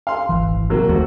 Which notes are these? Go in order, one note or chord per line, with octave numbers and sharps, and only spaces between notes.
F5 C6
D#1 G#1 E3
C3 F#3 A#3
D#2 F3 G#3 A3 C4 F#4